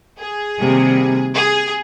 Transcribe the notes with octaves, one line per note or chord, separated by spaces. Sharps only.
G#4
C3 D#3 G3 A#3
G#4